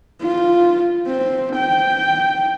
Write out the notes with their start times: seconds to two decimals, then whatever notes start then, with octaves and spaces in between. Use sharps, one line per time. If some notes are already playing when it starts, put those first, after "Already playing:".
0.22 F4
1.07 C4
1.57 G5